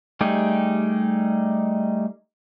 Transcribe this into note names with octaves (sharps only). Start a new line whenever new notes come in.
G3 A3 D#4 G4 G#4